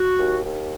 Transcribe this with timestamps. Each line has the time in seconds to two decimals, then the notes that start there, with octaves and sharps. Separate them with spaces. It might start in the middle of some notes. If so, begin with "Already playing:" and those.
Already playing: F#4
0.18 D#2
0.44 D#2